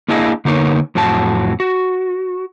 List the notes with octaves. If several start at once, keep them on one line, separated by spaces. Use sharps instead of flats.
A#3 D4 E4 G#4 D#5 F5
D3 A#3 B3 D#4 A#4 C#5
F2 A2 F#3 F#4 A5
F#4